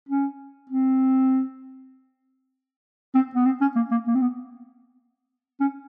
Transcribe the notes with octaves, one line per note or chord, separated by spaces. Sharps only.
C#4
C4
C4
B3
C4
C#4
A#3
A#3
A#3
C4
B3
C#4